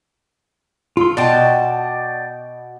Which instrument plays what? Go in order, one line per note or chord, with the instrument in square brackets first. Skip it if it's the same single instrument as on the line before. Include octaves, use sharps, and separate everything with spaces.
[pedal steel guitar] F4 C6 [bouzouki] A4
[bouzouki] B2 D#5 A5 [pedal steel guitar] D5 G5